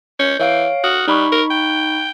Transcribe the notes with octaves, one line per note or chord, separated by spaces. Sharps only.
C#4 G6
E3 C#5 F5 D7
F#4 D#6 F6 F#6
G3 D#4 B5 C#6
A#4
G5